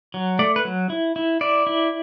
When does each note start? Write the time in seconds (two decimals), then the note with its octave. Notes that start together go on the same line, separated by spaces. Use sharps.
0.14 F#3
0.39 A3 D5
0.56 B4
0.65 F#3
0.90 E4
1.16 E4
1.41 E4 D5
1.67 E4